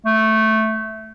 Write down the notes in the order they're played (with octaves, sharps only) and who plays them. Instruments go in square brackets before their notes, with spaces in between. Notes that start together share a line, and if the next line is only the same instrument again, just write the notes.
[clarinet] A3